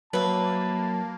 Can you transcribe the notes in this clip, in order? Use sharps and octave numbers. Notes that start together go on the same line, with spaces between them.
F#3 A#3 B4 E5 A5